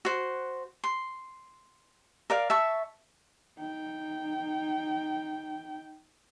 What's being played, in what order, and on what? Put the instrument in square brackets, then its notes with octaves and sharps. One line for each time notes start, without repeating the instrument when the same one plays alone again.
[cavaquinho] F#4 C5
C6
A#4 D5 F5
E5 A5 C#6
[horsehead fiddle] D#4 G5